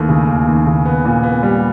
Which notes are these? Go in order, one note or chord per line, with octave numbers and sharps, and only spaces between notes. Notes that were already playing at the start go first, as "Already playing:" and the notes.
Already playing: D#2 E3 A3
C#3
D#2
D#2
C#3
B3
A#2
B3
G3